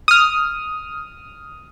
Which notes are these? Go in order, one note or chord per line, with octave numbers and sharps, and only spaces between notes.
D#6 F6